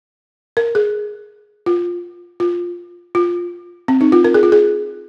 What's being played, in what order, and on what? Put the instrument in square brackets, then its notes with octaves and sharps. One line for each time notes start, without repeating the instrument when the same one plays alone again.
[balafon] A#4
G#4
F4
F4
F4
C4
D#4
F4
A#4
G#4
F4
G#4